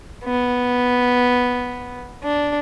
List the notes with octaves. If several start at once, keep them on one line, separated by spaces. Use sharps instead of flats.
B3
D4